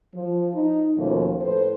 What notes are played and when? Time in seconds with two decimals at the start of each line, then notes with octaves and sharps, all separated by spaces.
0.15 F3
0.54 D#4
0.97 D#2 B2 F3 A3 C#4 C5
1.41 A2 A4 B4 C5